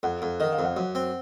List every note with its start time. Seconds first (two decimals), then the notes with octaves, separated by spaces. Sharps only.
0.03 F2 F#5
0.22 F2
0.40 D#3 D#5
0.52 F5
0.59 F2
0.64 F#5
0.77 F#2
0.95 C4